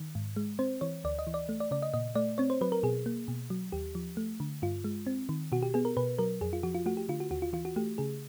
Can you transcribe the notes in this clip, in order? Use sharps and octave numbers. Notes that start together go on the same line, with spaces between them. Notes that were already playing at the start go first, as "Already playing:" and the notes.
Already playing: D#3
G#2
G#3
C4 C5
E3 C#5
D2 D5
D#5
E3
D5
A3
D5
C#3 D5
D#5
A#2 D#5
A3 D5
C4 C#5
C5
F#3 B4
A#4
B2 G#4
A#3
B2
F#3
D#2 G4
F3
A3
D3
G2 F4
G#3
C4
D#3
B2 F#4
G4
B3 G#4
A#4
B2 B4
F#3 A#4
F2 G#4
F4
F3 F#4
F4
A3 F#4
G4
D3 F4
F#4
D#2 F#4
F4
E3 F4
F#4
A3 G4
C#3 G#4